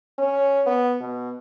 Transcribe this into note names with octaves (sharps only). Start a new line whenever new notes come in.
C#4
B3
B2